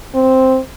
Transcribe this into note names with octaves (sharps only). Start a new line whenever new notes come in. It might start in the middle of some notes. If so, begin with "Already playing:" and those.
C4